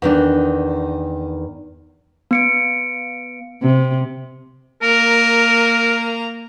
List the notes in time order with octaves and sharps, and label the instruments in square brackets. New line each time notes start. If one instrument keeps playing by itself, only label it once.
[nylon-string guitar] E2 D#3 D4
[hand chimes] B3 C#7 D7
[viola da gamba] C3
[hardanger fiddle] A#3 A#5 [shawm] A#4